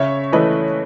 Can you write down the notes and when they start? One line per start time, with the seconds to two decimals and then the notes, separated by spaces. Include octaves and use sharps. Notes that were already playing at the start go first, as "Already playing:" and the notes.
Already playing: C#3 C#5 E5
0.32 E3 A3 B4 D#5